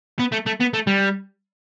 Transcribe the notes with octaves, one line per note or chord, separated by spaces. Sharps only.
B3
A3
A3
B3
A3
G3